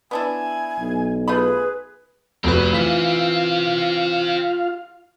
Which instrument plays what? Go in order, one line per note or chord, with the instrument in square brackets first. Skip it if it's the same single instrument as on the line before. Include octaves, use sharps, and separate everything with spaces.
[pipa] B3 D4 E4 [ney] G#5
[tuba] B1
[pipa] A3 F4 B5 [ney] G#4 [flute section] B4
[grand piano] F1 F#4 B4 [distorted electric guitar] C4 E5
[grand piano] E3 B6 [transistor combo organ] F4 F5